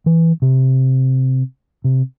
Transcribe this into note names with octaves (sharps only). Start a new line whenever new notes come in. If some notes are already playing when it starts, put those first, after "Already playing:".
E3
C3
C3